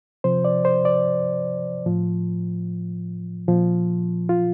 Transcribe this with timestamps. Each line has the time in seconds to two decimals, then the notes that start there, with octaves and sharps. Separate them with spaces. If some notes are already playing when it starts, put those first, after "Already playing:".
0.24 C3 F3 C5
0.45 D5
0.65 C5
0.85 D5
1.86 A2 F3
3.48 A#2 F3
4.29 F4